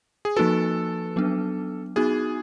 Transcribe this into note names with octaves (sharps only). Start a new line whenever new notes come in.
G#4
F3 A#3 D#4 F#4 A4 B4
F#3 B3 D4
B3 D#4 F#4 G#4